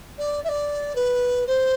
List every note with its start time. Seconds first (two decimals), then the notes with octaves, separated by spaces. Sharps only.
0.18 D5
0.44 E5
0.48 D5
0.95 B4
1.46 C5